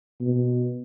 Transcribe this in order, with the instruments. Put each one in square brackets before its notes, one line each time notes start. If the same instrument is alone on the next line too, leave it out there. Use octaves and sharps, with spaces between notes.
[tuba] B2